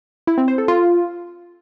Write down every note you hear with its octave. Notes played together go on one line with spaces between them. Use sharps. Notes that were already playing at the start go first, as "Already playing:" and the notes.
E4
C4
C5
A4
F4